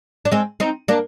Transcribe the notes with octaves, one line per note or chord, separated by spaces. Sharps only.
D4
G#3 C4
C4 D#4
A#3 D4